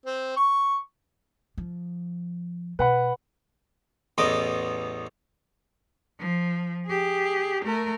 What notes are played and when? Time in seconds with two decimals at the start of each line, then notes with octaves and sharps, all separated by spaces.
0.05 C4
0.37 C#6
1.58 F3
2.79 B2 B4 F#5 B5
4.18 A1 E2 B3 D#5 D6
6.19 F3
6.86 G4 G#4
7.64 A3 A#4